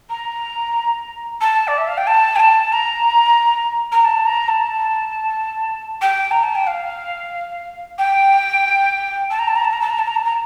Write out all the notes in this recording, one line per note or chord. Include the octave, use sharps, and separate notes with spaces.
A#5
A5
D5
E5
F5
G5
A5
G5
A5
A#5
A#5
A5
A#5
A5
G5
A#5
A5
G5
F5
G5
A5
A#5
A5
A#5
A5
A#5
A5
A#5
A5
A#5
A5
A#5